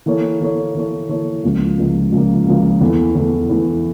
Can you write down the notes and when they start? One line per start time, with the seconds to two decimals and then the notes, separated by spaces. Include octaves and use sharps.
0.06 E3 A#3 E4 A4 C#5
0.40 E3 A#3 E4 A4 C#5
0.75 E3 A#3 E4 A4 C#5
1.09 E3 A#3 E4 A4 C#5
1.43 C#2 C#3 F3 A#3
1.78 C#2 C#3 F3 A#3
2.12 C#2 C#3 F3 A#3
2.47 C#2 C#3 F3 A#3
2.81 E2 E3 A3
3.15 E2 E3 A3
3.50 E2 E3 A3